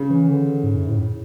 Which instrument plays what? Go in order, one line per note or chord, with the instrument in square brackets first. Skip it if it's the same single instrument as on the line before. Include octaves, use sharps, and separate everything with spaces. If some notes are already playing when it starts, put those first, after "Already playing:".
Already playing: [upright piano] C#3
[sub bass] E3
D3
G#2
F#2
A2